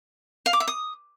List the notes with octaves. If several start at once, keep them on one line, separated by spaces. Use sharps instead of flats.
F5
D6
E5
D#6